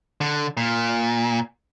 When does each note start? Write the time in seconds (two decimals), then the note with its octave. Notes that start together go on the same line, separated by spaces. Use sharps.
0.21 D3
0.57 A#2